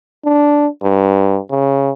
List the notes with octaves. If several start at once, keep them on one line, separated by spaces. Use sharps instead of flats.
D4
G2
C#3